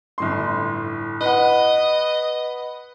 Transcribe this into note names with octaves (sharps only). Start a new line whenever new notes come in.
G1 A2 C6
B4 D#5 F#5